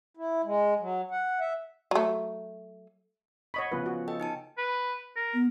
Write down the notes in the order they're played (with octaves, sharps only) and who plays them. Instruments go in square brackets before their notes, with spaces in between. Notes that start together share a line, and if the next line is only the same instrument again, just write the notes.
[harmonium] E4
G#3
F#3
F#5
E5
[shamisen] F#3 A3
[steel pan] C#5 D#5 B5 [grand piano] F#5 C#6
[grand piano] C#3 F3 B3 [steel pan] B4
[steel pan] F#4
[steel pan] A4 [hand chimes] D#5 G5
[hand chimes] D#4 G#5 A5
[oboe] B4
A#4
[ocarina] B3